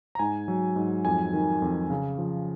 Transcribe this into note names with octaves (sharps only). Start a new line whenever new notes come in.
A#5
G#2 G#5
F#3
G#2
F2 G#5
D#3
F2
C#3
F3